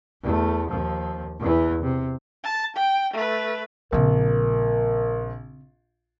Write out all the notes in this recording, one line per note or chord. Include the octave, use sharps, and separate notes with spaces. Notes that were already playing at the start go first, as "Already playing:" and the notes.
E2 A3
D#2 F3
E2 E3
C3
A5
G5
A3 B4
A#1 C#3 C4 A#4